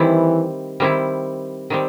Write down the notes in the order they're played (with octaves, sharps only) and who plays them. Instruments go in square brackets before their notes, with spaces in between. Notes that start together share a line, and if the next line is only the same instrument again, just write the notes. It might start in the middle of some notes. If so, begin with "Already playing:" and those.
Already playing: [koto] D#3 G3 C4 E4 [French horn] E3
[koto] D#3 G3 C4 E4
D#3 G3 C4